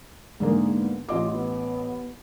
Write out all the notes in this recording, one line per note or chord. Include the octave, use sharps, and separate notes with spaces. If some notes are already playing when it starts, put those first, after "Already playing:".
G#2 D3 A#3 G#4
B3
A1 F4 D#5 D6
B3